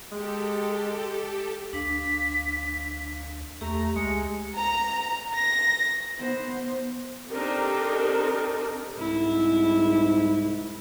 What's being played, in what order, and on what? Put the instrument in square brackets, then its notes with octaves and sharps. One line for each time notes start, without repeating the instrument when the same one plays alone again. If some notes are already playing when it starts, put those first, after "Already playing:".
[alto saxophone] G#3 [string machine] G4 A4
[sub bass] D2 [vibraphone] D4 F5 [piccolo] B6
[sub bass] E2 [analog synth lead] A3 [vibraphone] G4 [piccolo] A#5
[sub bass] C#2 [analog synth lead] G#3 [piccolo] C#7
[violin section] A#5
A#6
[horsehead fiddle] B3 C5
[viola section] C4 D4 D#4 G4 A4 A#4
[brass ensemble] C2 G#2 [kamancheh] E4